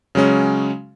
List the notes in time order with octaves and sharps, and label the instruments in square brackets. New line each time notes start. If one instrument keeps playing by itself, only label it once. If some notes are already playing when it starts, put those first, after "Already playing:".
[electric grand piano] C#3 F#3 G#3 C#4